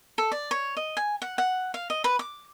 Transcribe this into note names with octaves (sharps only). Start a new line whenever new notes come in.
A4
D5
C#5
D#5
G#5
F#5
F#5
F5
D#5
B4
D6